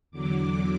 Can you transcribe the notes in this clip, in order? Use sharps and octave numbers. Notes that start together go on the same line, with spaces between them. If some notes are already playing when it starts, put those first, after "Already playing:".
E2 D3 F#3 D6